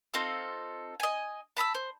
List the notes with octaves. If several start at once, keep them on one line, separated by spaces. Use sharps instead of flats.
C4 D#4 F4 A4
D#5 G#5
A5 B5 D#6 E6
C5